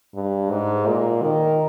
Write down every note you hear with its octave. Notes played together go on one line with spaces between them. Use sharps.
G2
G#2
A#2
D#3